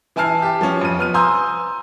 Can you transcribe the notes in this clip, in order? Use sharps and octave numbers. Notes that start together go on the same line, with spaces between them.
E3 E4 G#5 A5 F6 C7
G4 A5
F3 C#4
F2 D#7
B3 F6 D#7
G#5 A#5 C6 D#6 E6 G6